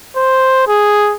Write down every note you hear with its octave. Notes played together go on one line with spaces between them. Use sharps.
C5
G#4